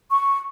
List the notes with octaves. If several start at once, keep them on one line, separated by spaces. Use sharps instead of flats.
C#6